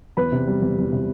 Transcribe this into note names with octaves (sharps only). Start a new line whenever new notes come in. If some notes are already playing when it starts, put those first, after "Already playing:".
E2 B4 B5
C3
G3
E2
E2
C3